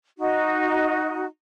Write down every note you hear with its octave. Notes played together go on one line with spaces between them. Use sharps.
D#4 F#4